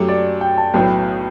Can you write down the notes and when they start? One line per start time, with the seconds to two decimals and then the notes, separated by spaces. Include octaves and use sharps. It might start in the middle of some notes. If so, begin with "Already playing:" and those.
Already playing: F#2 F#3 A3 G4
0.09 D5
0.41 G5
0.57 A5
0.74 B1 A2 F#3 B3 G5